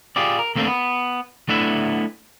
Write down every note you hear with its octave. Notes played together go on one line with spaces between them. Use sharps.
F4 G4 G#4 D5
A#4
D#2 A3 A#3 C4 D4
B3
A3 B3 D4 E4 E5